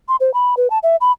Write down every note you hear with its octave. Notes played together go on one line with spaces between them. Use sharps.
C6
C5
B5
B4
A5
E5
B5